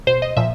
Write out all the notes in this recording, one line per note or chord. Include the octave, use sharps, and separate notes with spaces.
B2 C5
D#5
A#2 F3 E5